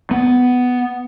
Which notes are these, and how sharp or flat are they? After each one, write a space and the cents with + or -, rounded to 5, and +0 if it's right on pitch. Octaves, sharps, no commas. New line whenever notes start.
B3 +10